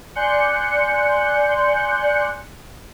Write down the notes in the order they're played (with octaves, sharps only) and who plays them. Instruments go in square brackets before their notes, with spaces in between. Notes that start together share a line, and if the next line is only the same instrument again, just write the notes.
[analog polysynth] D5 G#5 C6 F#6 G6 C#7